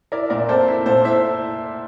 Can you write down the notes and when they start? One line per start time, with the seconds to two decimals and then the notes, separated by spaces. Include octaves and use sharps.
0.12 E4 A#4 D5
0.30 A#2 A#4 D5
0.49 C4 A4 C5
0.68 E4
0.86 A#2 A4 C5
1.04 E4 C5 E5